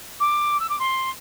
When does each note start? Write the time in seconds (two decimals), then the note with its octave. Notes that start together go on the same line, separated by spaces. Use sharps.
0.20 D6
0.60 E6
0.69 D6
0.79 C6